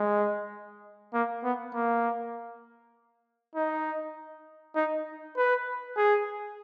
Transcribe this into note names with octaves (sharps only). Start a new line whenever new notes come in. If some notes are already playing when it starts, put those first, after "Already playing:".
Already playing: G#3
A#3
B3
A#3
D#4
D#4
B4
G#4